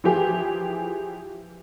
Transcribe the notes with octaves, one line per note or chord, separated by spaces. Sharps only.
E3 F3 G4 G#4